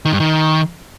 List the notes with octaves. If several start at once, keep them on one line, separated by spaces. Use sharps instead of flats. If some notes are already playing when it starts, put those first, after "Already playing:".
D#3
G2
D#3